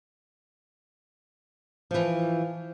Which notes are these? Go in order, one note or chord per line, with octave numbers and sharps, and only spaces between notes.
E3 F3